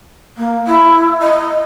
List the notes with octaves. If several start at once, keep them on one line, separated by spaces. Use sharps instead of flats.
A#3
E4
D#5